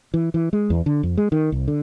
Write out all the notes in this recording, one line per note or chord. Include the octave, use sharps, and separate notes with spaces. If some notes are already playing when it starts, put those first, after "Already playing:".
E3
E3
G#3
E2
D3
F2
G#3
D#3
C2
D3